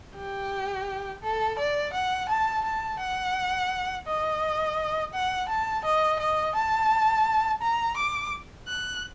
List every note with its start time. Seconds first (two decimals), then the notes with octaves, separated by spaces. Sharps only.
0.16 G4
1.23 A4
1.59 D5
1.93 F#5
2.29 A5
2.65 A5
3.00 F#5
4.07 D#5
5.14 F#5
5.49 A5
5.85 D#5
6.20 D#5
6.56 A5
7.62 A#5
7.97 D6
8.68 F#6